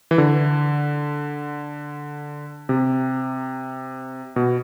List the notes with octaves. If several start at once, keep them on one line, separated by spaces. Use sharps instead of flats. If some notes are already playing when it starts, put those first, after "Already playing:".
E3
D3
C3
B2